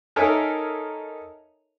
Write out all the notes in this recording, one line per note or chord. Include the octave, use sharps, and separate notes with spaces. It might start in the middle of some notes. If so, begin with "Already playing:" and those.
D#4 A4 A#4 C#5 E5 G#5